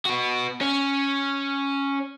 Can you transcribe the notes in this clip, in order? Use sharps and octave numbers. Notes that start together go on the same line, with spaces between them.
B3 F#4
C#4